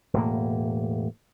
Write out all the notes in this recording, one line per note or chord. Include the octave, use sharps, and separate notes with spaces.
E1 A2 A#3